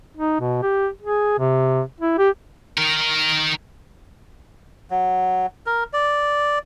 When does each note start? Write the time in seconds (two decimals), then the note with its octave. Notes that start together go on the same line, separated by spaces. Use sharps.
0.17 D#4
0.40 B2
0.62 G4
1.01 G#4
1.39 C3
2.01 E4
2.18 G4
2.78 D#3 A#4
4.91 F#3
5.66 A#4
5.93 D5